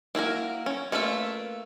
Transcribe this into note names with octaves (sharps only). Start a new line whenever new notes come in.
A#3 E4 F#4 A#4
C#4
A3 A#3 F4 B4 E5